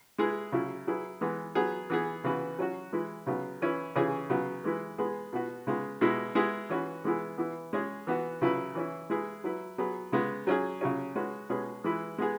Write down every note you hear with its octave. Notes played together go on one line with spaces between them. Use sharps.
G#3 E4 G#4 B4
C#3 F#3 E4
F#3 E4 G#4 B4
E3 G#3 B3
F#3 B3 G#4
E3 B3 G#4
C#3 E3 B3 F#4 B4
F#3 C#4 F#4
E3 G#3 E4 B4
C#3 F#3 B3
E3 C#4 E4 B4
C#3 E3 C#4 G#4
C#3 F#3 B3
E3 G#3 E4 B4
G#3 B3 G#4 B4
B2 B3 F#4 B4
C#3 G#3 B3
B2 G#3 E4
G#3 B3 E4 G#4
E3 C#4 F#4 B4
E3 G#3 B3 E4 G#4
E3 B3 E4
G#3 C#4 G#4
E3 B3 F#4
C#3 F#3 E4 B4
E3 C#4 E4
G#3 E4 G#4 B4
F#3 E4 B4
F#3 B3 G#4 B4
C#3 G#3 B3
F#3 C#4 G#4
C#3 F#3 C#4
G#3 C#4 F#4 B4
B2 G#3 C#4 G#4 B4
E3 G#3 E4 B4
G#3 B3 G#4